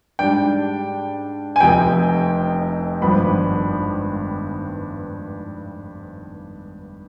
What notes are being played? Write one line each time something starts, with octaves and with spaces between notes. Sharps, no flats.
G#2 G3 D4 G5
G#5
F1 F2 C3 G5
G#1 G2 F3 B3 B5